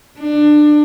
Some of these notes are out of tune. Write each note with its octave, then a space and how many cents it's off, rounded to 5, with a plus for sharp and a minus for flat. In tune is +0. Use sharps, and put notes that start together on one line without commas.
D4 +20